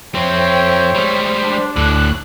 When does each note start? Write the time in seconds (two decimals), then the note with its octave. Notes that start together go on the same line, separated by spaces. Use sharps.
0.15 F2 C4 C5 C#5 E5 G5
0.95 G3 G#3
1.42 D4
1.76 D2 A2 D3 F#6